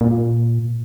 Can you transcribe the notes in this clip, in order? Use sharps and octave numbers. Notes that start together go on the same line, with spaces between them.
A#2